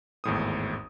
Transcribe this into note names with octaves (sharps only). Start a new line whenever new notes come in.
G#1 E2 A2 D#6